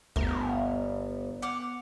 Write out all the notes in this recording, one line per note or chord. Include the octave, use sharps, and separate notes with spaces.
G1 D2 B3 A#4
F#5 D6 F6